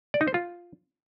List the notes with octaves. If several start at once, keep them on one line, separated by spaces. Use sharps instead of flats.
D5
D#4
C5
F4